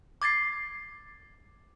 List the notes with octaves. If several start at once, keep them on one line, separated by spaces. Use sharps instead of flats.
D6 G#6 A6 C7